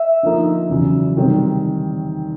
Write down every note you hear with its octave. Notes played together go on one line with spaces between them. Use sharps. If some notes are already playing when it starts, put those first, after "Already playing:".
Already playing: E5
D3 F3 A#3 D#4
E2 C#3 F#3
C3 D#3 G3 C4